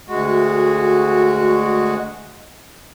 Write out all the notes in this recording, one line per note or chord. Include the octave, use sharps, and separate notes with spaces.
D2 G#3 F#4